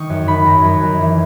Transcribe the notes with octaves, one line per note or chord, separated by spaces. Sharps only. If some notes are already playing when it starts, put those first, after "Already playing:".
Already playing: D#3 C#6 D#6
F#2
D#3 B5
F#2 A#5
F#2
F#2
E3